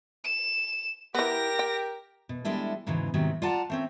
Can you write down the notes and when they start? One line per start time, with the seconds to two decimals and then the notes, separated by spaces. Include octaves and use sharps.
0.24 E7
1.15 E3 B3 G4 A#4 A#6
1.59 G5
2.29 B2
2.45 G3 G#3 D4 E4 A4
2.86 E2 G#2 C#3 E3 F#3
3.14 G#2 C3 D#3 F#3
3.42 F4 D5 F#5 A5 A#5
3.70 A3 C4 C#4